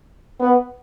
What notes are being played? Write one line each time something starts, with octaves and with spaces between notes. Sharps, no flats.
B3